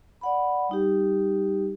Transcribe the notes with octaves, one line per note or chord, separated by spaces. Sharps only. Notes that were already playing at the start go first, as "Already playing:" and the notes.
D5 F#5 B5
G3 D#4 G4